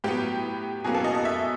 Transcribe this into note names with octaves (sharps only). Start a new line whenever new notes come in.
A2 F#3 B3 G4
B2 F#3 A#3 C#4 G#4
A4
D#5
D#5
E5